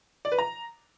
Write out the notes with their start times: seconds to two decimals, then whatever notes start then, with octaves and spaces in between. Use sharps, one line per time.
0.25 D5
0.32 B4
0.39 A#5